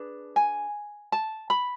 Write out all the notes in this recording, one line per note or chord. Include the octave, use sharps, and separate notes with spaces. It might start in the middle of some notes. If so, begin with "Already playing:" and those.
Already playing: D4 G#4 B4
G#5
A5
B5